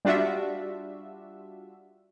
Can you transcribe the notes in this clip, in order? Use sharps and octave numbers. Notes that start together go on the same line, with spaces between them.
G3 D4 F4 F#4 E5